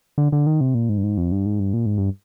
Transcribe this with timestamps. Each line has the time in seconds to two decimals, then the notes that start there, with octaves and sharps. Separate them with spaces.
0.18 D3
0.32 D3
0.47 D#3
0.61 C3
0.75 A#2
0.89 G#2
0.97 G2
1.04 G#2
1.17 F2
1.32 G2
1.46 G#2
1.60 G2
1.73 A#2
1.86 G#2
1.98 G2